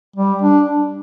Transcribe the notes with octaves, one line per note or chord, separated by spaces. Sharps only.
G3
D4